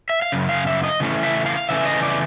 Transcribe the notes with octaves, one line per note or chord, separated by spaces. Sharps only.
E5
F5
F#2 C#3
F5
E5
D#5
C#3 E3 A3 C#4
E5
F5
C#3 E3 A3 C#4 E5
D#5
D5